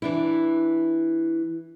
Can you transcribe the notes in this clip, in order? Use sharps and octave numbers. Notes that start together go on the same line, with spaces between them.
E3 D4 E4